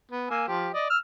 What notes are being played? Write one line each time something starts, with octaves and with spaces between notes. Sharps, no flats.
B3
A#3 G#5 E6
F3 G4
D5 D#5
E6 F6